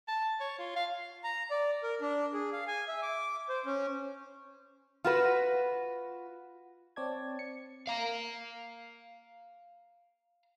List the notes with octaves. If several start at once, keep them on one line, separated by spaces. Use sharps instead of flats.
A5
C#5
F4
F5
A#5
D5
A#4
D4
G#4
F5
G#5
E5
D6
C5
C#4
F4 F#4 B4
C4 C#5 D5 A5 G#6
C#7
F5 A#5